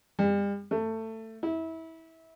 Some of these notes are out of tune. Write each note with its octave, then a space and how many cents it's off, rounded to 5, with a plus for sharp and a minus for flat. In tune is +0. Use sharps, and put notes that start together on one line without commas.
G3 +40
A3 +20
E4 -25